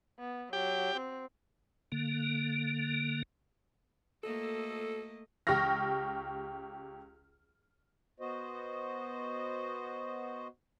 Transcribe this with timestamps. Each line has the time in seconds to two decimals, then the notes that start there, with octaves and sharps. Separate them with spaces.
0.19 B3
0.53 F#3 G4 G5
0.96 C4
1.92 D3 A#3
4.23 A3 A#3 A4 D#5
5.47 C#2 G4 C#6 F6 A#6
8.20 B3 F#4 C5 D#5